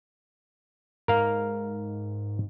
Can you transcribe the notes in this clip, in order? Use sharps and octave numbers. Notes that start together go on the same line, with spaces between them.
G#2 A#4 F5